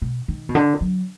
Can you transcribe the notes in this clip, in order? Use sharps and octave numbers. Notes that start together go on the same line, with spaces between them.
B2
D#3
B2
D3
F#3